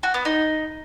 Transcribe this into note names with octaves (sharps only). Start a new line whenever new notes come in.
F#4
B3
D#4